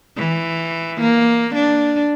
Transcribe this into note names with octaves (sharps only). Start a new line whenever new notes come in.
E3
A#3
D4